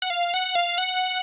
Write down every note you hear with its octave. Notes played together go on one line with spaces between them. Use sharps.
F#5
F5
F#5
F5
F#5